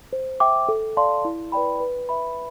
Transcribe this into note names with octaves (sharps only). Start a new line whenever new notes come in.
C5
E5 G5 D6
A4
D5 F5 A5 C6
E4
B4 D5 G5 B5
B4
E5 B5